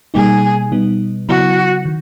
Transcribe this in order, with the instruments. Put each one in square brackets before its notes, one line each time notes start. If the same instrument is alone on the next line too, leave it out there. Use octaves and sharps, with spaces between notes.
[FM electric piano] B2 G3 A#3 D#4 [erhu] G#4
[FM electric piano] B2 G3 B3 D#4
[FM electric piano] C#3 F#3 B3 E4 [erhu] F#4
[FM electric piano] D#3